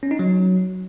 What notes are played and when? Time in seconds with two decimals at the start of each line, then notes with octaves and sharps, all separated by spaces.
0.03 C#4
0.11 D#4
0.19 F#3